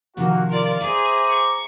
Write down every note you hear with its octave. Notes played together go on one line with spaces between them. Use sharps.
C3 D#3 F3 A#3 F#4 F#5
F4 A#4 D5
G#4 C5 E5 A#5 D6
C#6